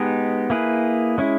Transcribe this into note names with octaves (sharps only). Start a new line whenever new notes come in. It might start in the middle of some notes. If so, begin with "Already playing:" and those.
Already playing: G#3 B3 D#4 G4 B4
A#3 E4 G#4 B4
G#3 C#4 E4